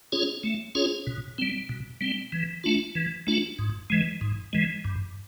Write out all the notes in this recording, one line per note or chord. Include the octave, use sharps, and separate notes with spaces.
C#4 F4 G#4 C#5
A3
C#4 F4 G#4 C#5
B2
G3 C4
B2
G3 C4
E3
A3 D4 F4
E3
A3 D4 F4
G#2
E3 G#3
G#2
E3 G#3
G2